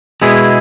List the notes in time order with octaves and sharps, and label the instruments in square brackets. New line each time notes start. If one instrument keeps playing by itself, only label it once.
[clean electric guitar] B2 G#3 B3 E4 G#4